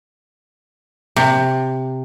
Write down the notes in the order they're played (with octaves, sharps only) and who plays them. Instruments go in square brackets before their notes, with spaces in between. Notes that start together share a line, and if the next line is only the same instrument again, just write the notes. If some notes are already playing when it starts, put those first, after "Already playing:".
[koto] C3